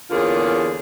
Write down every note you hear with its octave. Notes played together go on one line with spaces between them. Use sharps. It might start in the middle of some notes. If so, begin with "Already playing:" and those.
E2 D3 A#3 C#4 F4 G#4